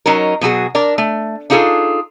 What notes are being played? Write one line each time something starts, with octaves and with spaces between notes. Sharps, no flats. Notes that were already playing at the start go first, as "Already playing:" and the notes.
F#3 C#4 D#4 A#4
B2 F#3 F#4 G#4
D4 A#4 D5
A3
D4 D#4 F4 G#4 A4